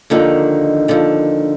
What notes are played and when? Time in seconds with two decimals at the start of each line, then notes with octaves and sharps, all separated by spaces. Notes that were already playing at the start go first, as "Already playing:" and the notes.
0.10 D#2 D3 D#3 F3 D#4
0.88 D#2 D3 F3